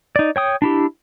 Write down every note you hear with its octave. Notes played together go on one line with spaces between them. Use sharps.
D#4 D5
C#5 G5 D#6
D4 E4 G4